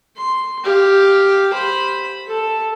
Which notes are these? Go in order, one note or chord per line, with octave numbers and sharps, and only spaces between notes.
C6
G4 F5
C5 B5
A4